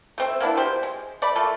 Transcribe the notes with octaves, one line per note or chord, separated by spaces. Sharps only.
A3 C4 E5
A#3 B3 D4 E4
B2 C4 G4 C5
G#3
A3 D5 B5
A3 A#3 F4 A4